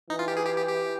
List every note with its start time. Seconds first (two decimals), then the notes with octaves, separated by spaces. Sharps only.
0.10 E3 D#4
0.19 F4
0.28 G4
0.37 G#4
0.45 G4
0.56 G4
0.68 G4